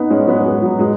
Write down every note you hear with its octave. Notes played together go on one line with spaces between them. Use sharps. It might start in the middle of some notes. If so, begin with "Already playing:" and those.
Already playing: B3 D#4
G#3 C#4
F#3 B3
G#3
F#3
G#3